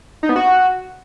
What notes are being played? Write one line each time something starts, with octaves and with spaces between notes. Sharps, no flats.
D#4
B3
F#4